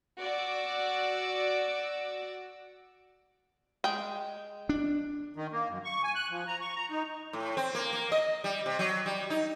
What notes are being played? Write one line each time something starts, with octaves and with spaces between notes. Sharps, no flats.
F#4 D5 D6 E6
G#3 G5
D4
D#3
A#3
F#2
C#6
G#5
F#6
F3
A#5
C#6
A#5
D#4
A2
C4
A#3
A#3
D#5
G3
C3
F#3
G3
D#4